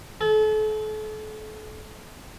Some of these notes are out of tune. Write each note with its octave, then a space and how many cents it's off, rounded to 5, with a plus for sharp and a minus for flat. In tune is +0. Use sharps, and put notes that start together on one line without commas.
A4 -40